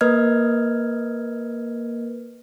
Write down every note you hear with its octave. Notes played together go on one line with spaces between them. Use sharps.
A#3 A#4 B4 D#5 F6 G#6